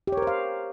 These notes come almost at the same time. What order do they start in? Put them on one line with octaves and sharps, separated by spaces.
G4 C#5 A#4 C5 F5